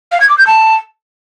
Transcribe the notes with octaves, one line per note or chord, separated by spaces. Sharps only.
F5
G#6
D6
G6
A5